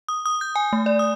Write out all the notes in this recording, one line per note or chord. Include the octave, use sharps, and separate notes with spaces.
D#6
D#6
G6
G#5
A3
D5
D#6